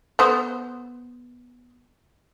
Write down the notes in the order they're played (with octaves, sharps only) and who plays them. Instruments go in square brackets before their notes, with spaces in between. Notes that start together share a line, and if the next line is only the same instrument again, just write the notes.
[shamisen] B3 A4 C5